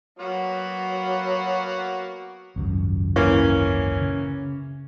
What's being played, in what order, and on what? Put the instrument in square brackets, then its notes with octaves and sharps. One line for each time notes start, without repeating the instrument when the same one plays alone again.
[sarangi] F#3 [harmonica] A#3 B3 F#4
[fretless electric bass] G#1 C#2 F#2
[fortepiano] E3 A#3 C#4
[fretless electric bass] C#3